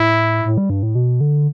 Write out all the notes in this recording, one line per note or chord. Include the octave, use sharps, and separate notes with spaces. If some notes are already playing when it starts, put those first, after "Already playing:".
Already playing: A2 E4
A2
G3
G2
A2
B2
D3